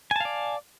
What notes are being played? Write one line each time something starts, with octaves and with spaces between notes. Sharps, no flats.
D5 F5 G#5 A5